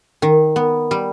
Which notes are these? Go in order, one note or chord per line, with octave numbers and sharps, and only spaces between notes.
D#3
B3
G3